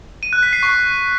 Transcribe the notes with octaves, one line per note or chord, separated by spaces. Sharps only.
D#7
F#6
B6
C7
C#6